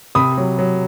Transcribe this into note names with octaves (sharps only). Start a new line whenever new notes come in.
C3 B5 D#6
F#3
F#3